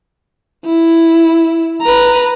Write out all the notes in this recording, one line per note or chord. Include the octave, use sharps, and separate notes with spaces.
E4
B4 A#5